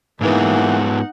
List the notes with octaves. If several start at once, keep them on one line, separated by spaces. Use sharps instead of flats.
G#2 E3 G#3 A#3 B3 D#4 F#5